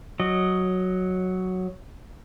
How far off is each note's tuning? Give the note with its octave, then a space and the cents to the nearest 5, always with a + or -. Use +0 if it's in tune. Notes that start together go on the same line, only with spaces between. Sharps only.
F#3 +0 D#5 +0